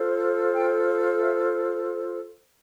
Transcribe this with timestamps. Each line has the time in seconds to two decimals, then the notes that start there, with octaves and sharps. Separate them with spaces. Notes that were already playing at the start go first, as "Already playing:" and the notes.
Already playing: F4 A4 C5
0.53 G5
0.86 F5
1.20 E5